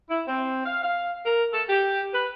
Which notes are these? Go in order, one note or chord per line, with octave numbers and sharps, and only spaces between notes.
E4
C4
F5
F5
A#4
A4
G4
B4